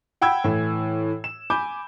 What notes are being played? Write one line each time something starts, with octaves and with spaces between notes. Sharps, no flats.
F#5 G5 B5 E6 G#6
A2 E3
E7
G#5 B5 D6 G6